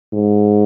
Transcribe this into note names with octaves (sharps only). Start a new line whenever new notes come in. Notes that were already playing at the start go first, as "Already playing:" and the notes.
G#2